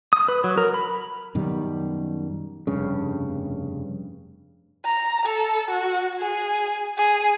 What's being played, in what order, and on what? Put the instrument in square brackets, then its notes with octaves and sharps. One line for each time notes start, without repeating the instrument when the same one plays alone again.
[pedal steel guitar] D#6
B4
F#3
A#4
B5
[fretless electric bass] F#2 B2 D#3 G3
F1 G2 C#3
[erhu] A#5
A4
F#4
G#4
G#4